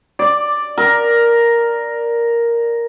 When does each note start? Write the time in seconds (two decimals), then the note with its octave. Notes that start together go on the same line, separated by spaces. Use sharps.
0.19 D5
0.78 A#4